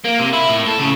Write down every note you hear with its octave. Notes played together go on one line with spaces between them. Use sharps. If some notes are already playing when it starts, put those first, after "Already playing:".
A#3
C3
E4
A2
A4
C#3